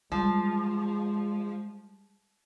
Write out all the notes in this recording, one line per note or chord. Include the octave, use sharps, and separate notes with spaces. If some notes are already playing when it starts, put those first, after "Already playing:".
F3 G3 G#3